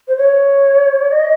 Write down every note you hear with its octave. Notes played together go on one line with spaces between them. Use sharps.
C5
C#5
D#5